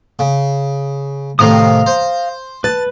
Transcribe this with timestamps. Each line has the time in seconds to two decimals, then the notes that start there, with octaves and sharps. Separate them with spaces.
0.19 C#3
1.39 A2 C3 D#3 F5 A#5 D#6
1.86 C5
2.64 B4 A5